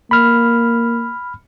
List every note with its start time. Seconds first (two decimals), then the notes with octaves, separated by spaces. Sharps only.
0.11 A#3 B5 F6